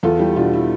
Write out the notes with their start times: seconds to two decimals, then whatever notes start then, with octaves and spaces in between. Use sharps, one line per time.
0.03 E2 F4 A4
0.19 G3 E4 G4
0.36 B2 D4 F4
0.53 E4